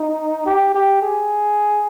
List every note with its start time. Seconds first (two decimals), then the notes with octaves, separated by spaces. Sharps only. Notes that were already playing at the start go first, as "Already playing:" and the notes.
Already playing: D#4
0.46 G4
0.75 G4
1.03 G#4